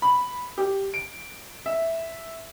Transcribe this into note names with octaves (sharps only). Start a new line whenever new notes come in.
B5
G4
D7
E5